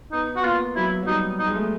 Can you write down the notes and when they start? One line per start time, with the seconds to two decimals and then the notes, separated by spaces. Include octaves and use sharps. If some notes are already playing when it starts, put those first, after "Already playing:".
0.12 B3 D#4
0.36 B3 F#4
0.44 A#3 F4
0.76 F#3 E4
1.03 F#3
1.07 G3 D#4
1.39 D#4
1.48 G#3
1.55 A3